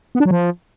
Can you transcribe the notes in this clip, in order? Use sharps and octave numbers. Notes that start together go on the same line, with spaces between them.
B3
D4
F#3
F3